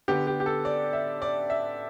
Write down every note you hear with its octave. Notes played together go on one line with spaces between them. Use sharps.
D3 B3 G4
G4
G4
A4
D5
E5
D5
E5